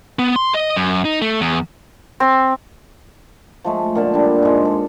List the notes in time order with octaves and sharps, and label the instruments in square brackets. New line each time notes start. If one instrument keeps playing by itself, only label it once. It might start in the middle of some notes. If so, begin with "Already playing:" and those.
[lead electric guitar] B3
C6
D#5
F#2
D#4
A3
E2
[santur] C4
[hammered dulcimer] F3 G#3 A3
A#2 D3 A5
G3 D4
G#2 G#3
A4